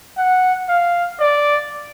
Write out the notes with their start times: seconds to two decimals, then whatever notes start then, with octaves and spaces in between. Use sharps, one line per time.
0.17 F#5
0.69 F5
1.20 D5